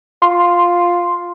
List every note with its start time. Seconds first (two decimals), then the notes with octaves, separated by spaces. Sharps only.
0.22 F4 C6